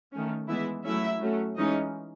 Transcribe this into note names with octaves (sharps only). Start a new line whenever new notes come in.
D#3 A3 C#4
E3 G#3 B3 E4 E5
F#3 A3 C#4 E4 E5
F#3 A3 C#4
E3 G#3 C#4 D#4 D#5